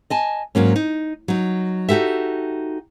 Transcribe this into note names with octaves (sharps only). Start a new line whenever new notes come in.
D#5 G#5 A5
G#2 F#3 A#3 C#4
D#4
F#3 D#4
D#4 F#4 G4 A4 E5